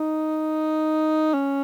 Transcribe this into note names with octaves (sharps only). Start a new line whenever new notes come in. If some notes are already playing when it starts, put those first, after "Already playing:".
Already playing: D#4
C#4